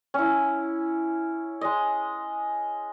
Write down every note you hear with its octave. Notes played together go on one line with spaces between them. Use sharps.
C#4 E4
G#3 D#5